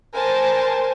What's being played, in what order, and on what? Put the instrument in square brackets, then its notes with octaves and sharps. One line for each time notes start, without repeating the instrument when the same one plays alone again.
[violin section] A#4 C5 G#5 A5